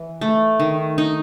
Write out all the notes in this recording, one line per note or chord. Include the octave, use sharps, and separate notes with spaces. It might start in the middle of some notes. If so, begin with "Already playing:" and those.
Already playing: E3
A3
D#3
D#4